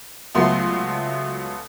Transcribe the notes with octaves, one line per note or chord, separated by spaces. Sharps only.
C#2 F#3 A3 B3 C6